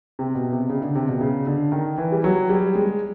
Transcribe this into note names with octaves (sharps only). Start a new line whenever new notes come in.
C3
B2
C3
C#3
D3
C3
B2
C#3
D3
D#3
E3
G3
F#3
G3
G#3